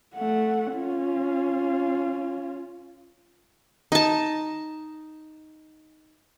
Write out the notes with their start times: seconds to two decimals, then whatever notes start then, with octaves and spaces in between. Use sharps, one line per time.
0.15 A3 F#5
0.74 C#4 F4
3.92 D#4 A5